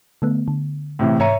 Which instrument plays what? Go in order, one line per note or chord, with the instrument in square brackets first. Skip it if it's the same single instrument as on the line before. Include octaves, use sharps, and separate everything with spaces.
[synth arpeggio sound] D3 A3 B3
D3
[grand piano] A2 C3 E3
[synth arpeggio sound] G#2 C#7 D#7 [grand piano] C#5 E5 A#5